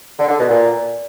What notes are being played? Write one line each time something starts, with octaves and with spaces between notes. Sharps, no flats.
D3
D3
B2
A#2